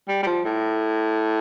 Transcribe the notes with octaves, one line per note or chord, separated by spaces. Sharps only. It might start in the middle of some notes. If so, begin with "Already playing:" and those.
G3
G3
F3
A2